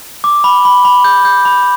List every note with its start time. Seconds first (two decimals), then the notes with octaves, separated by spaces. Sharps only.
0.24 D6
0.44 B5
0.65 B5
0.85 B5
1.04 G6
1.25 G6
1.45 B5